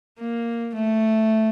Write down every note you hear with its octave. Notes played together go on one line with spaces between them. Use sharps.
A#3
A3